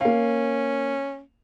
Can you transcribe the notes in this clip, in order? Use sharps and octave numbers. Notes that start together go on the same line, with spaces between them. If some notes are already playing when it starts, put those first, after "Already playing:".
A#3 C#4 F5